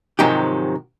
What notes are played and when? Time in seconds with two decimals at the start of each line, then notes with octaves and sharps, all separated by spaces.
0.19 G#2 C3 D#3 F3 F#3 G4